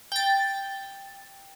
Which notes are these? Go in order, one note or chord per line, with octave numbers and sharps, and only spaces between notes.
G5 A6